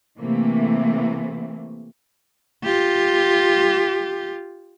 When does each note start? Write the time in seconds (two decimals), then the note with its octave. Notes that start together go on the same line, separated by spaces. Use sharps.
0.19 C3 E3 A3 A#3
2.64 F4 G4